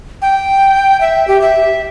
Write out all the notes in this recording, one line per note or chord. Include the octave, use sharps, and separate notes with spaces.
G5
E5
G4
E5